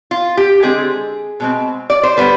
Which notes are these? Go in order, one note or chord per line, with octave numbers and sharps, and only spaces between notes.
F4
G4
D3 G#3 C4 G#4
B2 G#3 C4
D5
C5
D3 G3 B3 B4